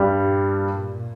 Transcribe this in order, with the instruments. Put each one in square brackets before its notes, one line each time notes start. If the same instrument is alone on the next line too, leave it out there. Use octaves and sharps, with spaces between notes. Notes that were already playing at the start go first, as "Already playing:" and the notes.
Already playing: [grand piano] G2 G3
[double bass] A#2